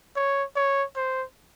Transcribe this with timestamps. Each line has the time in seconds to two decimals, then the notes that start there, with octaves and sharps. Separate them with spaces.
0.16 C#5
0.56 C#5
0.96 C5